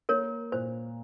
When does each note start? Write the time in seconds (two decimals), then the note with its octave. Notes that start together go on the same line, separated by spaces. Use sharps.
0.09 A#3 A#4 C#5
0.52 A#2 C5